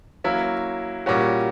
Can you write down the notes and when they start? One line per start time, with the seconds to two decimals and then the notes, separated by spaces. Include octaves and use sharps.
0.24 F#3 A#3 C#4 E4
1.06 A#2 G3 C#4 F#4